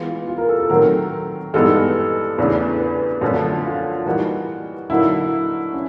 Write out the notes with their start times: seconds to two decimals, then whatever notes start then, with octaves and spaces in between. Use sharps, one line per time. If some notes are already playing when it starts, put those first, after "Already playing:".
Already playing: E3 G#3 B3 F4
0.28 F4
0.38 A#4
0.49 A4
0.60 A4
0.70 D#3 F#3 A3 C4 A#4
1.54 G2 E3 G#3 B3 D#4 A4
2.38 E2 C#3 E3 A3 D4 B4
2.79 B4
3.21 F#2 D3 F3 A3
3.64 F4
4.06 E3 G3 A#3 D#4 F#4
4.90 D3 F#3 A#3 D#4 E4 F#4
5.73 C#4